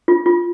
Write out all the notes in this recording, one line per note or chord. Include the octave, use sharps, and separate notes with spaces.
F4
F4